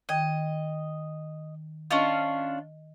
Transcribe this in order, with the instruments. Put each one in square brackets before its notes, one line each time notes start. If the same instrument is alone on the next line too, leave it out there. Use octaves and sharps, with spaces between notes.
[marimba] D#3 G5 G#6 [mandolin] D#5
[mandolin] C#4 D4 F4 [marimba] D#5